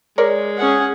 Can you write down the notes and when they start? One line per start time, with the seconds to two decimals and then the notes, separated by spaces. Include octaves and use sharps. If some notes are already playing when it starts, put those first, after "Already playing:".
0.18 G#3 A#4 C#5 D5
0.58 C#4 G#4 F#5